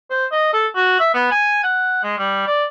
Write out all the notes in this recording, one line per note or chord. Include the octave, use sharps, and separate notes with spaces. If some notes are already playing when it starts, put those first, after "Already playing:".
C5
D#5
A4
F#4
E5
B3
G#5
F#5
G#3
G3
D5